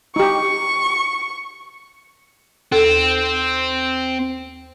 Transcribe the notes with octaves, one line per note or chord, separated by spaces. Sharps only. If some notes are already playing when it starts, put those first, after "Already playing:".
D#4 G4 C#6
D#2 C4 A4